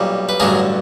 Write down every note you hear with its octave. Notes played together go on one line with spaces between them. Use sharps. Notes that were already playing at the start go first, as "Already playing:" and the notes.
Already playing: B1 A#2 G3
B4
A1 G2 D3 F#3 G#4 A#4